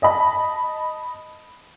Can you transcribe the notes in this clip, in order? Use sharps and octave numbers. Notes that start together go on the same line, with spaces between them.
D#5 A5 B5